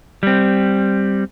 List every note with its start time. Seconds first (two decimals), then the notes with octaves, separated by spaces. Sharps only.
0.23 G3 C4